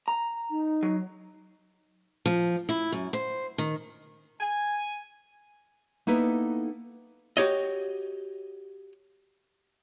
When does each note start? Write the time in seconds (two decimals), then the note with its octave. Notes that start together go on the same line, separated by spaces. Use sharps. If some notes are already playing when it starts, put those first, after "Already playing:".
0.08 A#5
0.51 D#4
0.83 F#3
2.26 F3
2.69 E4
2.92 F#2
3.13 C5
3.58 D#3
4.40 G#5
6.07 A#3 B3 D#4 E4 A4 B4
7.37 F#4 G4 C#5 D#5